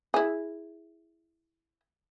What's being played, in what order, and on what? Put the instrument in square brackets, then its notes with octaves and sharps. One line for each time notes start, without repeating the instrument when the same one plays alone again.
[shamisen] E4 G#4